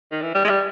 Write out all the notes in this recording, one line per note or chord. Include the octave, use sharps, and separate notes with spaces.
D#3
E3
G3
G#3
G3